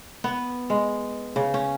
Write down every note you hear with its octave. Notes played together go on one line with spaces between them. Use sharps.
B3
G#3
C#3
C#4